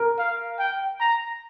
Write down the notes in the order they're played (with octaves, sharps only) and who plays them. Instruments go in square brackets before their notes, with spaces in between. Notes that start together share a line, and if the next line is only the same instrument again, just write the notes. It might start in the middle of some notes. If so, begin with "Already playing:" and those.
Already playing: [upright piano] A#4
[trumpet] F5
G5
A#5